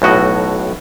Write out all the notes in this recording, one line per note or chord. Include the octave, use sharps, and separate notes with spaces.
B1 A2 F#4 D#5